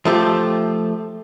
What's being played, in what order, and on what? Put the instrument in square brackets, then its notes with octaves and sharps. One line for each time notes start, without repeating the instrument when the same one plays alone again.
[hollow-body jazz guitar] F3 A3 G4